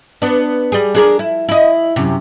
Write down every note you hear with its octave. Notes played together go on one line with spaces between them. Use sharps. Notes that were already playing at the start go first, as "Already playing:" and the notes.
B3 D4
G3 G#4
D4 G#4 A#4
E4
E4 D#5
F#2 C3